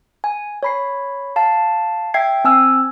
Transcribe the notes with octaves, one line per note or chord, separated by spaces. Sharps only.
G#5
C#5 B5 C7
F5 A5
E5 G5 G#6 C7
C4 G#5 E6 F6 G#6